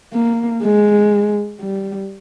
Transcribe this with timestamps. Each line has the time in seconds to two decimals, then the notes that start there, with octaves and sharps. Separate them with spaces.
0.13 A#3
0.63 G#3
1.61 G3